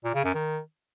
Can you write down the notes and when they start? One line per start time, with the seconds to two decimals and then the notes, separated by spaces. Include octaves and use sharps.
0.04 A#2
0.14 C#3
0.24 F#2
0.34 D#3